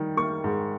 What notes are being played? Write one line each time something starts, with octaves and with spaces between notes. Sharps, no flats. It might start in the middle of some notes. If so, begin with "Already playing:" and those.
Already playing: D#3 G3
A#3 C#6
G#2